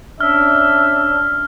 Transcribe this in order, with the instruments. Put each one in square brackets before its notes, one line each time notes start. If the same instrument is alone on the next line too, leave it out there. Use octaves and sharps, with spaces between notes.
[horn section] C#4 D4 [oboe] E5 [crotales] F6